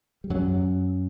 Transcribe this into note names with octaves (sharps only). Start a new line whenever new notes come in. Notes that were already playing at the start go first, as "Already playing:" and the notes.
G3
F#2 F#3